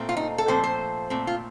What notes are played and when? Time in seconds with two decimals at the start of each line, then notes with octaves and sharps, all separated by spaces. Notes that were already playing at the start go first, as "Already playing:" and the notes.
Already playing: A#2 A3 C4
0.09 F4
0.17 D#4
0.38 A4
0.48 A#2 F3 A3 C4 C5
0.64 C5
1.10 A#2 A3 C4
1.27 F4